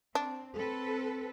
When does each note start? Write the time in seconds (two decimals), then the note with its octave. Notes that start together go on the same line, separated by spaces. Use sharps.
0.15 C4 D4
0.57 C4 A4 B4